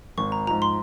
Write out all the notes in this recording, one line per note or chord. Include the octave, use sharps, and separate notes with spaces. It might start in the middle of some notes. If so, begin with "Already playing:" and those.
G#1 C#6
A#5
G#2 F3 A#5
C6